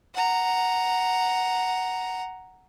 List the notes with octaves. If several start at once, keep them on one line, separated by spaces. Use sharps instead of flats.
F#5 A#5